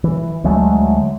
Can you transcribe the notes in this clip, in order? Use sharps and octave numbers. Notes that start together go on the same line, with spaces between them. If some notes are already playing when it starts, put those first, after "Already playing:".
E3
D2 F#3 G#3 A3